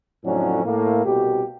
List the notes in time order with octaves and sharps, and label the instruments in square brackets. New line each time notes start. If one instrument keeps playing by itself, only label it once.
[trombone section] F2 A2 D3 F#3 C#4
A2 A#3
C2 B2 G4